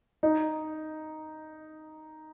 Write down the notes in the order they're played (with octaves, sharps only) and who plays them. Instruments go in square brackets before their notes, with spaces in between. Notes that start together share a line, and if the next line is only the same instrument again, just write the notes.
[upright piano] D#4